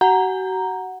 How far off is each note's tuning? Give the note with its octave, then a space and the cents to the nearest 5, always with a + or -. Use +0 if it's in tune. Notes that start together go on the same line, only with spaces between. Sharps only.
F#4 +35 F#5 +0 A#5 +0